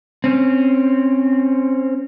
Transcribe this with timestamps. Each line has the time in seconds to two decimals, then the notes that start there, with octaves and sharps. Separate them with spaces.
0.24 C4 C#4